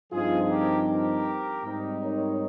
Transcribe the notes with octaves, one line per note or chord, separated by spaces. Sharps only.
G2 F3 C4 D#4 F4 G#4
G4 A#4
G4 A#4
G#2 G3 C4 D#4
A#4 C#5